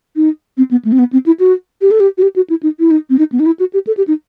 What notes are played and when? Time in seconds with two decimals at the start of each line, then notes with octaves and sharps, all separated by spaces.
0.16 D#4
0.57 C4
0.71 B3
0.85 A3
0.92 C4
0.99 B3
1.13 C4
1.26 E4
1.40 F#4
1.81 G4
1.91 A4
2.00 G4
2.18 F#4
2.22 G4
2.36 F#4
2.50 E4
2.63 D#4
2.80 E4
2.91 D#4
3.10 C4
3.19 D#4
3.32 B3
3.40 D#4
3.46 E4
3.60 F#4
3.73 G4
3.87 A4
3.97 G4
4.08 D#4